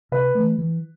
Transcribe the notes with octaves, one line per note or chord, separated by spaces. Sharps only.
C3 B4
E3 A3
E3